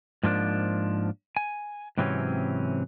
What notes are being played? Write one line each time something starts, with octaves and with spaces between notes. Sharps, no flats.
G#2 F3 A#3 D4
G#5
G#2 C3 E3 F#3 C4 C#4